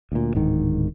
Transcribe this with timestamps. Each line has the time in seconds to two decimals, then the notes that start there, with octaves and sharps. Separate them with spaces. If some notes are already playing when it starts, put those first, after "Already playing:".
0.12 D2 A#2
0.35 D1 G#2 D#3